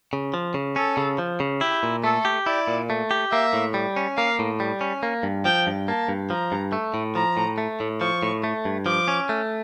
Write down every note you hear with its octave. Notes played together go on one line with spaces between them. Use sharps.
C#3
F3
C#3
C#4 A4
C#3
F3
C#3
E4 G4
A#2
A3 A4
G4
E4 D5
A#2
A3
G4
A#3 E5
A2
G3
C#4
A#3 F5
A2
G3
C#4
A#3
G2
F3 G5
G2
A#3 A5
G2
F3 A#5
G2
A3
A2
F3 A#5
A2
A3
A2
F3 C#6
A2
A3
G2
F3 D6
C#4
A3